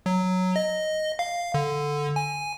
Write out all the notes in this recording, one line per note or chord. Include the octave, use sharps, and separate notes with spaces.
F#3
D#5
F5
D3
G#5